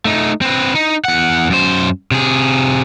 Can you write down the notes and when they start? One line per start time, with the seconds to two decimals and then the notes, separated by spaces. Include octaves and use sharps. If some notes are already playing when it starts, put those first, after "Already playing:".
0.05 A3 D#4
0.41 C4 B4
0.75 D#4
1.05 E2 F#5
1.50 F#2 C5
2.11 C3 G#4